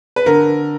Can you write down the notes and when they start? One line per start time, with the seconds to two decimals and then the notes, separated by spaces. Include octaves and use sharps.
0.16 B4
0.26 D3 A#4